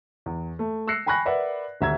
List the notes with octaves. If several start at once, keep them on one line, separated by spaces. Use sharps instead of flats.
E2
A3
E6 F#6 A#6 C7 C#7
G5 G#5 B5 C#6 F#6 A#6
A#4 B4 D5 E5 F#5
D#1 D2 E5 A#5 E6 G#6